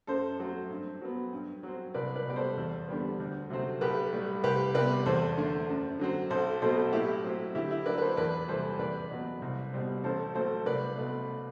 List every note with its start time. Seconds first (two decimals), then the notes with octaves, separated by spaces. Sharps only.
0.07 F#2 A4 C5
0.40 F#3 A3 C4
0.70 G2
1.01 F#3 B3
1.33 G2
1.63 F#3 C4
1.94 C2 B4 D5
2.16 B4 D5
2.26 B2 G3 D5
2.36 A4 C5
2.57 E2
2.88 D3 G3 B3
3.19 D2
3.50 C3 F#3 A3 C4
3.81 B1 G4 B4
4.12 A2 G3
4.43 C2 G4 B4
4.75 C3 G3 B3 B4 D5
5.06 E2 A4 C5
5.38 D3 A3
5.69 F#2
5.99 D3 F#3 C4
6.30 B1 A4 C5
6.62 B2 F#3 A3 C4 A4 C5
6.92 A2 E4 G4
7.24 F#3 C4
7.55 D2 E4 G4
7.71 E4
7.86 D3 F#3 B4 D5
7.98 B4
8.01 A4 C5
8.17 E2 B4 D5
8.48 C3 E3 G3 A4 C5
8.79 E2 B4 D5
9.11 B2 F#3
9.42 C2
9.73 B2 G3 C4
10.04 A1 A4 C5
10.35 A2 F#3 A3 C4 A4 C5
10.66 C2 B4 D5
10.97 B2 A3